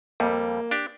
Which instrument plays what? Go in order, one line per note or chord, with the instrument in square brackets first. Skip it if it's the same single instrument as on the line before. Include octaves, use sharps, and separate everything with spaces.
[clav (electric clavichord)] F2 G3 [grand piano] A#3
[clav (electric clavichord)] D4 G4